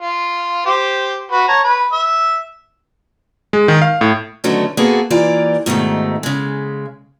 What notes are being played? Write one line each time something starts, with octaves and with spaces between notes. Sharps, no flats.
F4
G4 C5
F#4 B4
C#5 A5 A#5
B4
E5
G#3
D#3
F5
A2
D3 D#3 F#3 A3 B3 C#4
A#3 B3 F#4 G#4 A4
E3 A#3 F4 G4 D5
G#2 B2 D#3 A3
C#3 G#3